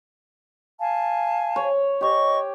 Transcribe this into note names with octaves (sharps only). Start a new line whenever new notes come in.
F5 G#5 A5
C#5
G4 C#5 D#5 C#6